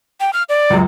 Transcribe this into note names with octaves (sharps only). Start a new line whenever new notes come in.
G5
F6
D5
C#2 F#2